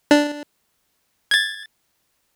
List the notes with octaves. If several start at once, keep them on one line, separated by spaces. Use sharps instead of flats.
D4
G#6 A6